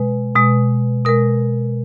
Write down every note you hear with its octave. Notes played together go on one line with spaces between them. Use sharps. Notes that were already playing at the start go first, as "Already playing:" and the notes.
Already playing: B2 G#3 B4
B2 G#3
B2 G#3 A#4